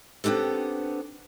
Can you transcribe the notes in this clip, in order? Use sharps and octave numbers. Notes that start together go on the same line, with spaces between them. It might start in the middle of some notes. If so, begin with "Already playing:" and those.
B3 C4 D4 G4 A4